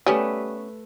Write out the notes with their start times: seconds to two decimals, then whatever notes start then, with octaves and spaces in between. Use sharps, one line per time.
0.06 G3 A3 B3 C#4 B4